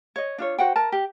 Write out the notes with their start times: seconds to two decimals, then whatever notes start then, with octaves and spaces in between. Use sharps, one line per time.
0.16 C#5 D#5
0.38 D4 F4 C#5
0.58 F#4 C5 F#5 G5
0.76 A#4 A5 A#5
0.92 G4